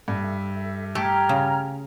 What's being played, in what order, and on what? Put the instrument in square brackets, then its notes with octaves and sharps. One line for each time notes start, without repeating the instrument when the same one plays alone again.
[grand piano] G2 [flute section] A4 E5
[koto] A3 [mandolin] G4 [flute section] A#5 F6 G#6
[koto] C#3